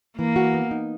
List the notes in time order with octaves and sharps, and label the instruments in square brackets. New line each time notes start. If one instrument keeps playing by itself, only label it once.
[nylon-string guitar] E3 [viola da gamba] A#3
[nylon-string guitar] F#4
B3
D#4